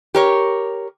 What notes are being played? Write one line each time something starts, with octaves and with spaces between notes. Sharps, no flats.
G4 A#4 C#5